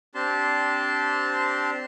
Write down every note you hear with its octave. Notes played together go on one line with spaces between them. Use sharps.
C4 D4 G4 A5 C6